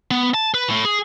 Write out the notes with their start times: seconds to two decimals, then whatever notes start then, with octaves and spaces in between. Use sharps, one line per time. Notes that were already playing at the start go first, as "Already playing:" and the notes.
0.11 B3
0.34 A5
0.54 B4
0.70 A2
0.85 G#4